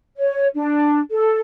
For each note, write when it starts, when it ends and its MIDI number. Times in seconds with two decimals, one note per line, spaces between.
0.17 0.47 73
0.55 1.00 62
1.11 1.40 69